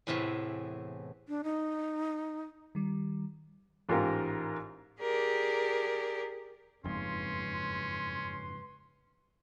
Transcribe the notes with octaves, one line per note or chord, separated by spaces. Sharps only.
E2 A2 C3 E3
D4
D#4
D#3 G3
A1 G#2 F4 G4 A#4
G4 G#4 A#4 D5
F#1 F2 G#2 C#4 B4 C6